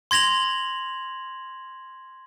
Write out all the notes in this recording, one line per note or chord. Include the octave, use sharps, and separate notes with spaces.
C6 G#6 A#6 F7 F#7